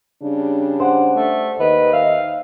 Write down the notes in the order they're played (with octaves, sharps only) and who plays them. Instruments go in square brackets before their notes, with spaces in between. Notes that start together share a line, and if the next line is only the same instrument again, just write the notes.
[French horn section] C#3 G3 D4
[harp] C5 D5 F#5
[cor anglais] A3
[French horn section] D#2 D#3 D#5 [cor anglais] B4
[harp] E5 [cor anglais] F5